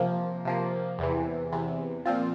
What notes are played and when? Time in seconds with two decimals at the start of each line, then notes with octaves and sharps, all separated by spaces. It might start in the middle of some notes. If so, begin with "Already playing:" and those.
Already playing: C3 F3 A#3
0.45 C3 F3 A#3
0.99 E2 C3 E3
1.52 E2 C3 E3
2.05 A#2 F3 C4 F4